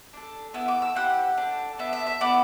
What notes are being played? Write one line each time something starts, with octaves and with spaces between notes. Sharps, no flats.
D4 A4
B3 E4 A4 E6
D6
E6
C4 E4 G4 F#5
D4 A4
B3 D4 A4 E5
E5
E5
B3 E4 A4 D5